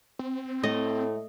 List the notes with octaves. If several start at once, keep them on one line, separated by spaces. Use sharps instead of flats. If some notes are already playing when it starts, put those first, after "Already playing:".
C4
A2 A3 D#5